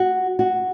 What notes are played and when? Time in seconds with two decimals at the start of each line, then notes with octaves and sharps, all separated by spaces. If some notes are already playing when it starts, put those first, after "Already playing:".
Already playing: F#4
0.39 F#4